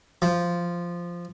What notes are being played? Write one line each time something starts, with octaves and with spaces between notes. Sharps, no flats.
F3